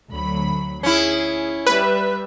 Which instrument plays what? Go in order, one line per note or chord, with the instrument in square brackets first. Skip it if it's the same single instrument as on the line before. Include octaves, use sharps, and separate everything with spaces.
[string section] D2 F#3 B5
[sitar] C#4 E4 [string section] G#4
[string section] G3 E5 [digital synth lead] B4